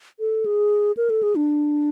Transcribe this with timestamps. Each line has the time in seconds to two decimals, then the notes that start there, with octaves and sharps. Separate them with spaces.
0.20 A4
0.46 G#4
0.97 A#4
1.10 A4
1.23 G#4
1.36 D4